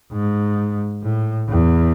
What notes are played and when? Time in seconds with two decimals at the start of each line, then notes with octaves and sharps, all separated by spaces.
0.13 G#2
1.03 A2
1.49 E2